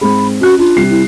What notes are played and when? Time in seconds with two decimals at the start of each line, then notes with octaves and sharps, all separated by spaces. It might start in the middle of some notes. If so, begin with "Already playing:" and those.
0.01 G#2 C4 G#4 B5
0.41 C#4 F#4 F#6
0.59 D4 F4
0.76 C3 G3 C7
0.90 E4